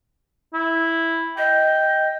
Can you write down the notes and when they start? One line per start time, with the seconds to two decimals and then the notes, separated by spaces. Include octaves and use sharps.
0.54 E4
1.38 D#5 G5